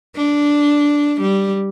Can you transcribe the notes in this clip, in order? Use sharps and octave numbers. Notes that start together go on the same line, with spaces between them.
D4
G3